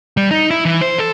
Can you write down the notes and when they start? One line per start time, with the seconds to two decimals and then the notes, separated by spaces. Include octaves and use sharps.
0.17 G3
0.31 D#4
0.51 E4
0.65 E3
0.82 C5
0.99 A4